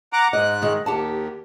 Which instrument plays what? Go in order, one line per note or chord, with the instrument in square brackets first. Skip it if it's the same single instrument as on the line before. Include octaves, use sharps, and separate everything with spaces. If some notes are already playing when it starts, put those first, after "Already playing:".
[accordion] F#5 A#5 D6
[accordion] G#2 F#6 [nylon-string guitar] D#5
[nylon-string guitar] D#3 G#3
[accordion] D#2 [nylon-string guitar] G4 F#5 A5